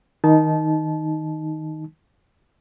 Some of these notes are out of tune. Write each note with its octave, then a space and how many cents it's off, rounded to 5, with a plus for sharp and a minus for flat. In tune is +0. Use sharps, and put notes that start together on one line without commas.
D#3 +15 D#4 +0 A5 -25